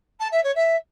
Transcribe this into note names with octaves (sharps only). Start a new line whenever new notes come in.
A5
E5
C#5
E5